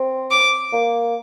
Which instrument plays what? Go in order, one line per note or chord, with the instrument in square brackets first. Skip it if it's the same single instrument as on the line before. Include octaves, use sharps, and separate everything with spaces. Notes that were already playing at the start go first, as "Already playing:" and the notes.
Already playing: [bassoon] C4
[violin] D6
[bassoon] A#3